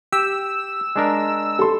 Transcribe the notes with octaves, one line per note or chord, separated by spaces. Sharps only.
G4 E6
G#3 D4 A#4
A4 C6